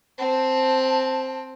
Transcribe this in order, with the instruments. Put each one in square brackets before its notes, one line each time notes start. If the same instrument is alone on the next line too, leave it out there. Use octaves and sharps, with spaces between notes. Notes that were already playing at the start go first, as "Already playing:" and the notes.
[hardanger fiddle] C4 [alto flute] A5